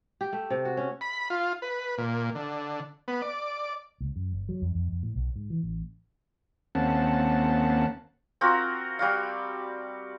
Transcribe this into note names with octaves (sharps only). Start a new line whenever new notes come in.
G4
A3
C3
F#4
C#4
B5
F4
B4
A#2
D3
B3
D5
C#2
F#2
G1
F#3
F2
F2
F2
A2
B1
G#2
E3
A1
D#2 A#3 C4 C#4 F#5 A5
C4 F4 F#4 A#4
G3 F#4 F5